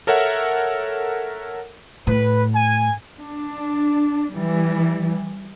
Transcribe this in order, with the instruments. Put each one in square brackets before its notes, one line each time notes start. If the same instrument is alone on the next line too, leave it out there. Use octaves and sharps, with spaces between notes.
[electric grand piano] A4 A#4 C#5 E5 F#5
[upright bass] A2 [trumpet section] B4
[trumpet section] G#5
[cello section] D4
E3 G3